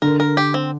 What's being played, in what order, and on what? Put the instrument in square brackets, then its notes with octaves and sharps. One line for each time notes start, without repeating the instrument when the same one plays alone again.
[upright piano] D3 [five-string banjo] A#4
[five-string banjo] A#4
G4
C4